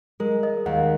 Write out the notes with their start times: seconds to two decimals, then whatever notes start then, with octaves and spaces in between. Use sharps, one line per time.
0.20 G#3 A#4
0.43 D#5
0.66 D#2 F#5